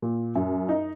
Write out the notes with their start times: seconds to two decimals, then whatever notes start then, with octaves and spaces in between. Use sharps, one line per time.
0.02 A#2
0.35 F#2
0.69 D#4